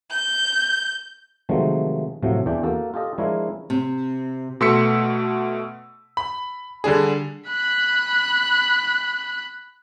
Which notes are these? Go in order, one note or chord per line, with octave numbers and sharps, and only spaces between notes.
G6
C3 D#3 F3 F#3 G#3 A3
A2 C3 F3 F#3
E2 E3 D4 G5
A#3 F#4 A4
F4 G4 A4 D#5
F3 G#3 D4 E4 A#4 C#5
C3
B2 A3 C6 E6 B6 C#7
B5
D3 G3 D4 G#4
B5 F#6